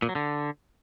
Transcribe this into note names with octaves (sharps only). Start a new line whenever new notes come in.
A#2
F#3
D3